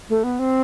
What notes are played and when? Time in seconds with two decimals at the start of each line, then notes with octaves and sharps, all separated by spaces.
0.09 A3
0.24 B3
0.39 C4